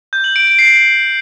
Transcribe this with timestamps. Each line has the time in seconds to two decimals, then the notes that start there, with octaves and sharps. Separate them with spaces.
0.13 G6
0.24 F#7
0.36 D7
0.47 D7
0.59 C7